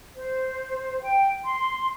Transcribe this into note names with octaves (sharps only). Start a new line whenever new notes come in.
C5
G5
C6